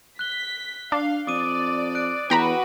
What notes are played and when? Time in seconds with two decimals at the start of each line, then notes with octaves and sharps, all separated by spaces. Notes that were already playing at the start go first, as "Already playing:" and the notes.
0.19 F#6 B6 G7
0.92 D4 F5
1.27 F2 D5 D6 D#6 D#7
1.95 F#6 D7
2.30 E2 F#4 B4 G5 A#5 B5